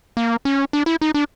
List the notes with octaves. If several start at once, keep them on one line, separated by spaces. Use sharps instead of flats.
A#3
C#4
D4
E4
D#4
D4